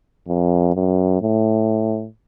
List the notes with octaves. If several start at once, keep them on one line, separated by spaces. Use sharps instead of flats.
F2
F#2
A2